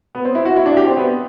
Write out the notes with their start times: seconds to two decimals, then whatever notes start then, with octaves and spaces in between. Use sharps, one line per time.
0.15 B3
0.25 C4
0.35 E4
0.45 F#4
0.56 E4
0.66 D4
0.77 G4
0.87 C4
0.97 B3